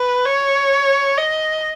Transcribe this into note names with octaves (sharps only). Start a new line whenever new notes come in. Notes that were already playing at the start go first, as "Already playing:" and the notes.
Already playing: B4
C#5
D#5